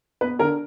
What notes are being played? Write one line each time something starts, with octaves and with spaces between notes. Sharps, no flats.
B3 B4
D3 A#4